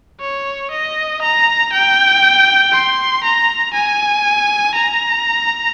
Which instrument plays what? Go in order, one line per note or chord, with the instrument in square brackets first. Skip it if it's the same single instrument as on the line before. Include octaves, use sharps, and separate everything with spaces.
[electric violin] C#5
D#5
A#5
G5
C6
A#5
G#5
A#5